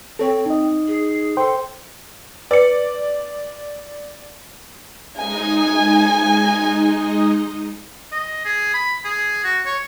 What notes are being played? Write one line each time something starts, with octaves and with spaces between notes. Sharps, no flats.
C4 A4 C#5
D#4 D#5
G#4
A4 C5 G5 C6
B4 D5 C#7
G#3 D#4 D#5 G#5
D#5
G#4
B5
G#4
F#4
C#5